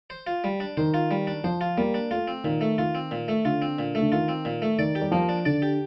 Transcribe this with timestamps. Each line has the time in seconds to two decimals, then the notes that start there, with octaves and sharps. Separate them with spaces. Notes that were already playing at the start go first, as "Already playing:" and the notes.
0.10 C5
0.27 F4
0.44 G3
0.60 D4
0.77 D#3 C5
0.94 F4
1.11 G3
1.27 D4
1.44 F3 C5
1.61 F4
1.77 G3 A#3
1.94 D4
2.11 A3 F4
2.28 C4
2.44 A#2 D#3
2.61 A3
2.78 D#3 F4
2.95 C4
3.11 A#2
3.28 A3
3.45 D3 F4
3.62 C4
3.79 A#2
3.95 A3
4.02 D3
4.12 D#3 F4
4.28 C4
4.45 A#2
4.62 A3
4.79 D#3 D5
4.95 G4
5.02 G3
5.11 F3 A#3
5.29 D4
5.45 D3 D5
5.62 G4